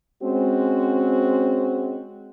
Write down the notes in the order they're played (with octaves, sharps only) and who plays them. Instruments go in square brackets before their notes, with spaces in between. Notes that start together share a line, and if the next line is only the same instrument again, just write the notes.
[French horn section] G#3 C4 C#4 F#4 C5